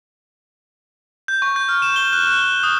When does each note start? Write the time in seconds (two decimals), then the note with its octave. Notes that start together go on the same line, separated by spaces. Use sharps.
1.28 G6
1.42 C#6
1.56 G6
1.69 F6
1.82 E7
1.96 G7
2.13 F#6
2.27 F#6
2.42 F#6
2.63 D#6